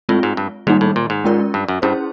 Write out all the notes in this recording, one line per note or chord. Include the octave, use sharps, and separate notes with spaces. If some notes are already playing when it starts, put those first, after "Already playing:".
A2 G#3 C4 F4
G#2
G2
G#2 D#3 G3 A#3 D#4
A2
A#2
G#2
G#3 C#4 F4 A#4 D5
G2
F#2
G2 C#4 E4 G#4 C5